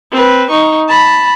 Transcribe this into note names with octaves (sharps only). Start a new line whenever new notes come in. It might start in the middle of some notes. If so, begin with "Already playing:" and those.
C4 B4
D#4 C#6
A5 B5